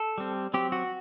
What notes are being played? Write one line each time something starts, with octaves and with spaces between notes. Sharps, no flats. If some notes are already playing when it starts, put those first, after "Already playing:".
Already playing: A4
G3 C4
F#3 C4 G4
F#4